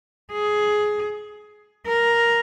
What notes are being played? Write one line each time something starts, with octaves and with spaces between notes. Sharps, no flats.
G#4
A#4